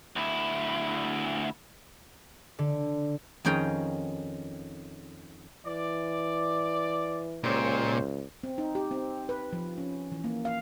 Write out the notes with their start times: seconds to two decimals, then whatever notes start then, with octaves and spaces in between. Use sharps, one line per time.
0.16 D2 E4
2.59 D3
3.45 F2 D#3 C#4 G#4 G5 A#5
5.66 E3 D5
7.44 C#2 A#2 G4 C5 C#5
8.43 C4
8.58 D#4
8.75 G4
8.91 C4
9.29 B4
9.53 F3
9.78 C#4
10.12 E3
10.24 A#3
10.45 F5